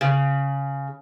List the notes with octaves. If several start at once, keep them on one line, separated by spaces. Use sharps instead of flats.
C#3